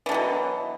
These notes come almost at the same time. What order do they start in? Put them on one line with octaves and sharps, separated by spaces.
E3 D3 B2 F#3